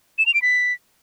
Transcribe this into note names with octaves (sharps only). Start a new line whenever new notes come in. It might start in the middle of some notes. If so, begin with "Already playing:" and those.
E7
F7
D7
B6